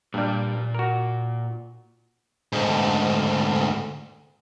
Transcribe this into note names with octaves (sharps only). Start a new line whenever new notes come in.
G2 A#2 G3
F#4 A#4
D2 G#2